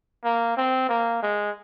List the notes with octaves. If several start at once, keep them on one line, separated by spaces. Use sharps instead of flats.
A#3
C4
A#3
G#3